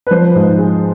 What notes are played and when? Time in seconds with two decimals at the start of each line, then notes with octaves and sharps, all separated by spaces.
0.07 B4
0.11 F3 C5
0.35 G#2
0.59 G#3